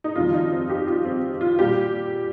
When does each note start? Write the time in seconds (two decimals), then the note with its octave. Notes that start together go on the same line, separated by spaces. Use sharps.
0.04 D#4
0.15 F2 D#3 G3 F4
0.34 D#4
0.51 C4
0.70 G4
0.87 F4
1.05 C4
1.41 F4
1.59 A#2 G3 G4